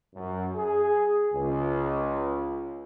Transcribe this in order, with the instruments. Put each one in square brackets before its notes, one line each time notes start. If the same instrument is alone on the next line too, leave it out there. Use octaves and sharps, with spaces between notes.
[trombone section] F#2
G#4
C#2